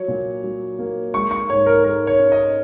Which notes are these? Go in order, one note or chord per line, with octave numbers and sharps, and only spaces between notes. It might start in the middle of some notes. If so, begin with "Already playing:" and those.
Already playing: F#3 C#5
A#2
F#3
A#3
G#3 C#6
C#6
G#2 C#5
A#4
G#3 A#4
C#5
C#4
D#5